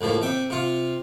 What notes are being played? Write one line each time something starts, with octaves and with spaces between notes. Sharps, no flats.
C#2 A2 F3 A#3
C3 E5 G5
C3 F4